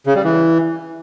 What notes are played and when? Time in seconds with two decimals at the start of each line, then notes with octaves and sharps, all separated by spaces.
0.06 C#3
0.15 G3
0.24 E3